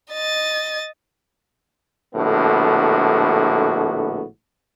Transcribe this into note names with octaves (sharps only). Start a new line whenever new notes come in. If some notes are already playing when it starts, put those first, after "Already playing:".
D#5 A6
A#1 A2 D3 B3 F#4